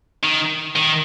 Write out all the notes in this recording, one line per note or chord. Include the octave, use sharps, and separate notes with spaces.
D#3
D#3